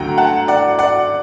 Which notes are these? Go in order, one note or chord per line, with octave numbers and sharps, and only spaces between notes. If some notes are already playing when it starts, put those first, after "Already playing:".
Already playing: D2 D3 F#3 F#5 G5 A#5
F#5 A5
D5 F#5
D5 F#5